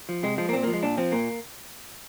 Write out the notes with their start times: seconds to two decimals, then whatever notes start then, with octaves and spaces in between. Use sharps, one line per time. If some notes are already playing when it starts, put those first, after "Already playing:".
0.09 F3
0.23 C3 G#3
0.38 F3 G#3
0.49 A#3
0.53 A#2 C4
0.63 F3 A#3
0.73 G#3
0.83 A#2 D4
0.97 F3 C4
1.12 A#2 A#3